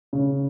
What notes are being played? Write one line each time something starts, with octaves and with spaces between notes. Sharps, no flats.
C#3